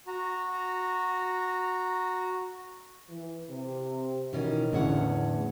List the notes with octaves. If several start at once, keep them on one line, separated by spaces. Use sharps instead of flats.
F#4 A#5
E3
C3
B2 D#3 E3 C#4
E2 A2 D3 E3 C#4 F#5